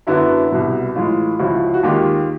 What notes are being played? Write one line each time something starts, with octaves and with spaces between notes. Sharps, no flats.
F#2 D3 F#3 B3 D4 E4 F#4
C2 B2 G3
A2 E3 G#3 F4
C#2 C#3 F3 E4 F#4
F#4
D#2 D#3 G#3 F4 G4